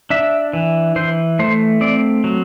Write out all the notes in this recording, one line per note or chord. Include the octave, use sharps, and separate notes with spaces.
D4 E5
E3
E3 C5
A3 C5
C4 D5
F#3